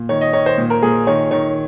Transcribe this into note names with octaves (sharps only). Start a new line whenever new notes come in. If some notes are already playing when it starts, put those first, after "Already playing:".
Already playing: A#2
D#3 C#5
D#5
D#3 C#5
C5
A#2
A#4
A#2 G#4
D#3 C#5
D#3 C#5